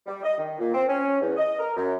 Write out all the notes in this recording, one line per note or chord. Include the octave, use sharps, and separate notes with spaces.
G3
D#5
D#3
A#2
C4
C#4
E2
D#5
A#4
F#2